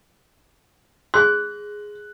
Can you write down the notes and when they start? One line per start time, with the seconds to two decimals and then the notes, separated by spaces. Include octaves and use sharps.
1.14 G#4 C6 F#6